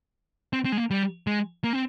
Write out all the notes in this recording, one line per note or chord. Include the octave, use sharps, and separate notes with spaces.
C4
C4
G#3
A#3
G3
G#3
A#3
C4